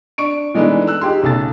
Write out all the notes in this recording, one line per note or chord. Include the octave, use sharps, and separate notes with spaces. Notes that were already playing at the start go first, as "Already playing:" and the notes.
D4 C#6 D7
E3 G#3 A3 B3 D4 D#4
E6 F#6
D#4 F4 G4 G#4 C6
B1 C#3 A3 A4 A5 A6